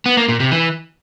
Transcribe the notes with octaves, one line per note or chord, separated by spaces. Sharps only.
B3
A#3
A#2
C3
E3